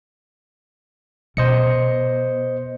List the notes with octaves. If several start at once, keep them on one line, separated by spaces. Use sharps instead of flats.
B2 C5 D#5 C#7